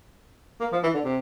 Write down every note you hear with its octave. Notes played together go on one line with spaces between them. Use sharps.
A#3
F3
E3
D3
C3